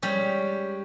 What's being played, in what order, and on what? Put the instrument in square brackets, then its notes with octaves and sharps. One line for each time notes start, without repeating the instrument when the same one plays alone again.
[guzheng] G3 G#3 C#4